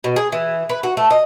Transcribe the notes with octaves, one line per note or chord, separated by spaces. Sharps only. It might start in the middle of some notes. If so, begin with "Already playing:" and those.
B2
G#4
E3
B4
F#4
A3
D#5